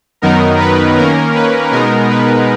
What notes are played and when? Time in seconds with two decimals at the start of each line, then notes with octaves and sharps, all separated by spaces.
0.22 F#2 D#3 F#3 B3 D#4 A#4
0.59 B4
0.97 D#3 A#3 C#4 A#4
1.35 B4
1.71 B2 G#3 B3 D#4 A#4
2.09 B4